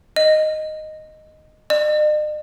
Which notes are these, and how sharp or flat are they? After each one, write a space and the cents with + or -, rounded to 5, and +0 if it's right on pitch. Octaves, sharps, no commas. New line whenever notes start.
D#5 -5
D#5 -45